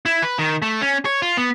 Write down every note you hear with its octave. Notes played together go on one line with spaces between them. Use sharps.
E4
B4
D#3
A3
C#4
C#5
F4
B3